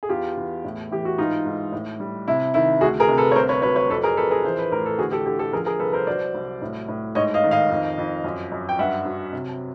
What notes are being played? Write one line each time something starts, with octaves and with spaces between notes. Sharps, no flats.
G#4
E2 F4 G4
E2
A2
E3 G4
F#4
G#2 D#4 F4
G#2
A2
G3
C3 E4
D#3 E4
D2 F#4 G#4
G#4 A#4
C3
A4 B4
C#5
C2 A#4 C5
B4 C#5
F#3 B4 C#5
B4 C#5
F2 A4 B4
G#4 A#4
F2 A4 B4
G#4 A#4
E3 C5
B4
A2 A#4
A4
D3 F#4 G#4
G4 A4
D3 G4 A4
G4 A4
F3 G#4 A#4
G#4 A#4
C2 A4 B4
A#4 C5
F#3 C5 D5
C2
A2
A2
G#2 C#5 D#5
D#5 F5
D#3
D#5 F5
F2
F2
F#2
F#2
G5
G2 E5 F#5
F#3
C3